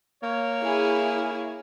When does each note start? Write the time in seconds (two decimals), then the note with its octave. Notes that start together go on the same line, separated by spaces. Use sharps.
0.23 A#3 C#5
0.61 E4 G#4